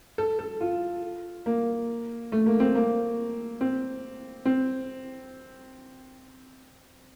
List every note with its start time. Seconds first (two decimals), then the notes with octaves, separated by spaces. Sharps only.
0.18 A4
0.39 A4
0.60 F4
1.46 A#3
2.32 A3
2.46 A#3
2.60 C4
2.75 A#3
3.61 C4
4.45 C4